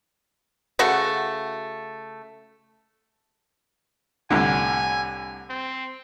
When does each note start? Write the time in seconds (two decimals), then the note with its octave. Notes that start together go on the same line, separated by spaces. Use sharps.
0.79 C#3 A3 F#4 F#5
4.30 C2 A2 D3 G#5
5.49 C4